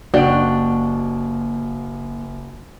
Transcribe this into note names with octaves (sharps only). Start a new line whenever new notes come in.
F#1 A#3 D4 F#4 G4 D#5 F#5 D7